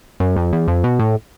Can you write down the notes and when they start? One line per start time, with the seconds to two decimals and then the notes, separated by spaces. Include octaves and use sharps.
0.20 F#2
0.36 F2
0.52 E2
0.68 F2
0.84 B2
0.99 A2